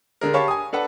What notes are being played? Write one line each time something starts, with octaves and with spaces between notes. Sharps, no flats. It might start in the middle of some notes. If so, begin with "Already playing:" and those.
D3 G#4 A#4
G4 C#5 F5 A5 B5 C#6
G#5 D#6
D4 A4 B4 F#5